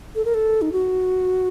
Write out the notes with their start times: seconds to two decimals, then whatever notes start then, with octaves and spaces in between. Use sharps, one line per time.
0.15 A4
0.25 A#4
0.34 A4
0.62 D#4
0.72 F#4